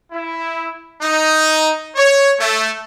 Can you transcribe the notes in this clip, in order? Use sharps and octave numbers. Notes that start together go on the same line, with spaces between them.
E4
D#4
C#5
A3